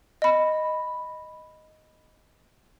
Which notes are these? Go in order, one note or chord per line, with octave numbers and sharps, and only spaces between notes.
D#5 B5